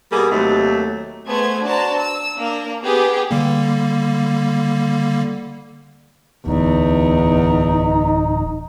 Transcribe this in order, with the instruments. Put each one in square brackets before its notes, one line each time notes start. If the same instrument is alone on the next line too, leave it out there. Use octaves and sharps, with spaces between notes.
[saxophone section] B2 G3 A#3 G#4
D#2 C3 F#3 A3 D#4
[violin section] A3 B3 G#4 C5 G#6
D4 F#4 C5 A5 A#5
E6
A#3 D4 A#4
B3 G4 G#4 F#5
[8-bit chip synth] D3 G3 A#3
[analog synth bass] D1 [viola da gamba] E2 [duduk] D#4